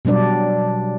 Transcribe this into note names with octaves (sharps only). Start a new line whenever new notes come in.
B2 F#3 G3 D4 D5